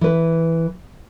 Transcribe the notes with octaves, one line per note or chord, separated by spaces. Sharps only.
E3 B4